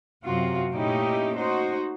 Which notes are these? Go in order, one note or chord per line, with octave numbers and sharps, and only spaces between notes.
F#2 C3 F4 F#4
A#2 A3 C#4 D#4 E4 G4
D#4 F#4 C5